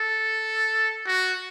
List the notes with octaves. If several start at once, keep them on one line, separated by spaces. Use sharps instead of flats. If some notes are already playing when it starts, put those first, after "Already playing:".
Already playing: A4
F#4